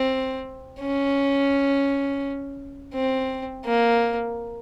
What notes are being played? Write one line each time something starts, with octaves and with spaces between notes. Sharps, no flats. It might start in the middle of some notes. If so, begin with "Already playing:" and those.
Already playing: C4
C#4
C4
A#3